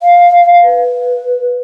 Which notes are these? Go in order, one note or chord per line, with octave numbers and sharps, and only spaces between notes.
F5
B4